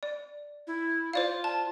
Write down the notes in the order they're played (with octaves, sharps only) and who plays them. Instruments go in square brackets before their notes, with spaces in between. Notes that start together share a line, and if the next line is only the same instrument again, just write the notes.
[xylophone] D5
[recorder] E4
[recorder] F4 [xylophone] C5 D5 F5
[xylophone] A5